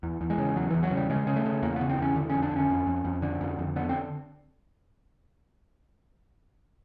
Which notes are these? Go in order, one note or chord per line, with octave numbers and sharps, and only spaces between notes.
E2
E2
G#3
C#3
E2 F#3
E2 E3
F#3
C#3
G3
C#3 G#3
C#3
A3
C#3
E2 A#3
C#3 B3
C4
E2 C#4
D3
F2 C#4
D4
F2 C#4
F2
F2
F2
D3
F2
F2
D3 B3
C4